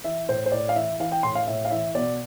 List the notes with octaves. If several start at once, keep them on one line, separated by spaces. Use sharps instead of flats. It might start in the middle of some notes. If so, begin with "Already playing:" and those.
E3 E5
A2 C5
C5
A2 D5
F5
E3 E5
E3 F5
G5
A2 C6
F5
A2 E5
F5
E3 E5
B2 D5